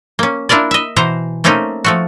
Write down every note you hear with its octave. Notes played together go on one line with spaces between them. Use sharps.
A#3 C#4
D4 E4 F4 A#4 D5
D#5 E5
B2 E3 C5 A#5
A3 A#3 C4 C#4 D#4
F3 A3 F#4